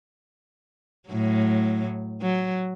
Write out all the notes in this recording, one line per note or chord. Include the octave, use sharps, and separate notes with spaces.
A2 F#3
F#3